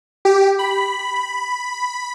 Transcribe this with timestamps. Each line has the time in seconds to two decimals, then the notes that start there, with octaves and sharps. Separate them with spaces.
0.25 G4
0.59 B5